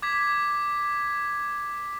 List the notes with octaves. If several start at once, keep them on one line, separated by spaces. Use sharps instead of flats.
D6 G#6 B6